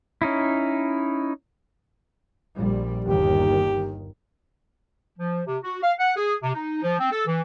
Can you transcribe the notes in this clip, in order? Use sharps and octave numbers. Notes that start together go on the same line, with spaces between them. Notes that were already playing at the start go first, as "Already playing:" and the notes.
C#4 D#4 E4
A#1 G3
G1 D#2 D#3 G4
F3
C3
F#4
F5
F#5
G#4
C3
D#4
F3
C4
A4
E3